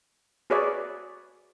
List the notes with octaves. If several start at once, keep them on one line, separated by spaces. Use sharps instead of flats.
F#4 G#4 B4 C#5 D5 E5